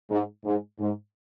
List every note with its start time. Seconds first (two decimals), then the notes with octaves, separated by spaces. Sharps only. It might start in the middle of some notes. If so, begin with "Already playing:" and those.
0.10 G#2
0.45 G#2
0.80 G#2